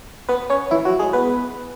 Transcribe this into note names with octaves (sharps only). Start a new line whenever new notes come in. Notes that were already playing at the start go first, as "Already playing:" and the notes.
B3 B4
C#4 C#5
E3 E4
F#3 F#4
G#3 G#4
B3 B4